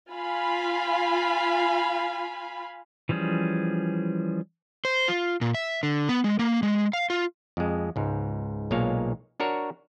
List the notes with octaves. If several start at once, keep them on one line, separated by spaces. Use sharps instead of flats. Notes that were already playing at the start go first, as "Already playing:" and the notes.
F4 F5 G#5 B5
E3 F3 G3 C#4 G#4
C5
F4
A#2
E5
D3
B3
G#3
A#3
G#3
F5
F4
F2 G#3
C#2 G#2
B1 A#2 G#3 A#3 C#5 F5
D4 F#4 A#4 C#5